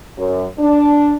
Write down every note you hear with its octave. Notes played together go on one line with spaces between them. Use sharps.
F#2
D4